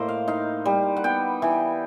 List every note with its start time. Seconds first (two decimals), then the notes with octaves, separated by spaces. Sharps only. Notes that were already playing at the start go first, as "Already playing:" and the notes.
Already playing: A2 A#3 C5 D#5
0.09 F5
0.28 D#4 F5
0.66 G3
0.97 F#5
1.04 B3 G5
1.42 E3